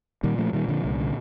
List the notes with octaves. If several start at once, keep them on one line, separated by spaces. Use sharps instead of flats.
A#2 D#3 G3
F3 A3
A#2 D#3 G3
D3 F3
C2 D3
D3